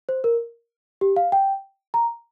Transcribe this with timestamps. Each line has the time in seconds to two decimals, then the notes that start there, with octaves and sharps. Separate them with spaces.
0.09 C5
0.24 A#4
1.01 G4
1.16 F5
1.32 G5
1.94 A#5